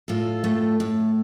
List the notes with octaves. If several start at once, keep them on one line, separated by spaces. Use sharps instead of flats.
A2 F4 A4
A3
A2